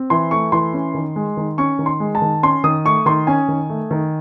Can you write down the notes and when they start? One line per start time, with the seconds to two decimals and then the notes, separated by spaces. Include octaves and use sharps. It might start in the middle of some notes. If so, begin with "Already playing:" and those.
Already playing: C4
0.10 E3 C6
0.31 A3 C#6
0.52 E3 C6
0.73 C#4
0.95 D#3
1.16 G#3
1.37 D#3
1.58 C#4 C#6
1.79 D#3
1.86 C6
2.00 G#3
2.15 A5
2.22 D#3
2.43 C#4 C6
2.64 D#3 D#6
2.85 A3 C#6
3.06 D#3 C6
3.27 C#4 G#5
3.48 D#3
3.70 A3
3.91 D#3